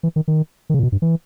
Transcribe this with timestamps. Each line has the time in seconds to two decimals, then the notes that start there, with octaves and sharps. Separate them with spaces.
0.03 E3
0.16 D#3
0.28 D#3
0.70 D#3
0.74 C#3
0.79 A#2
0.83 B2
0.92 G2
1.02 E3